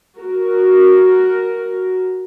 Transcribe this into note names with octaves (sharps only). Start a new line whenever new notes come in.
F#4 A#4